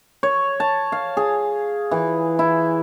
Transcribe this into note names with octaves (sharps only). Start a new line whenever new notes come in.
C#5
A5
F5
G#4
E3
E4